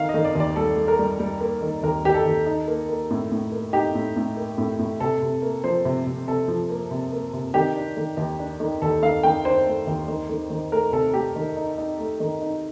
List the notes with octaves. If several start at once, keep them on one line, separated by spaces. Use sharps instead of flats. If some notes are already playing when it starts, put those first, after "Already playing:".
Already playing: D#3 F5
D#5
D#3
D5
D#2 D5
G3 A4
G3
A#4
G3
G3
A#3
D#3
D#2 A#4
D#3 G4
A4
D#2
D#4
A#3
A#3
A2
A2
A#3
D#4 G4
A2
A2
A#3
A2
A2
C3 A4
C3
A#3
F3 C5
C3
C3
C3 A4
F3
A#3
C3
A#3
C3
D#3 G4
D4
D#3
D#2
D4
D#3
D#2 A4
D#3 F5
D#3 G5
D4 C5
A3
D#2
D#3
D#3
D#3
A3 A#4
C3 A4
A3 G4
D#3
D#4
D#4
A3
D#3
D#4